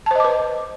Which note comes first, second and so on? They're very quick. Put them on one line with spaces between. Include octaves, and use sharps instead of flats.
A5 C5 D#5 D6 B4